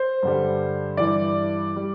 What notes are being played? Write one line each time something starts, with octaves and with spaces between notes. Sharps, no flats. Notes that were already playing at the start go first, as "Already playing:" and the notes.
Already playing: C5
G2 D3 G3
G2 E3 G3 D5
G3